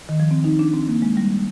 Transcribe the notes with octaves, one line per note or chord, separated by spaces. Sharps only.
D#3
F3
C4
D#4
D4
C4
A#3
G#3
G3